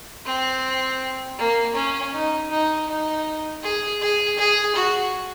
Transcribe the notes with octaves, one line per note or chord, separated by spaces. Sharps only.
C4
A#3
C#4
D#4
D#4
D#4
G#4
G#4
G#4
F#4